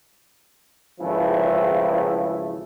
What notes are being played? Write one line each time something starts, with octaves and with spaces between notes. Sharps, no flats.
G#1 C#3 E3 F3 A3 E4